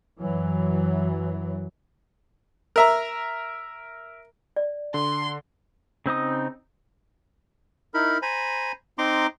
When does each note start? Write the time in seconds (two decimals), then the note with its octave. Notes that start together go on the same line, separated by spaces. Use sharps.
0.20 F#2 E3 F#3
2.76 A#4 E5 A#5
4.56 D5
4.94 D3 C6
6.06 C#3 C4 D#4 D#6
7.94 D#4 E4 A#4 B5
8.22 C5 G#5 A#5 B5
8.98 C4 D#4 A#5 C6 D6